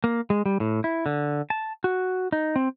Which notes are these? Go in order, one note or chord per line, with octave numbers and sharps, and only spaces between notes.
A#3
G#3
G3
A2
E4
D3
A5
F#4
D#4
C4